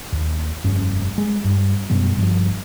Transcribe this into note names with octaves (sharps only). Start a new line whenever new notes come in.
D#2
F1 G2 C#4
G#3
G2
F#2 B2 G3 B3
G1 G2 F3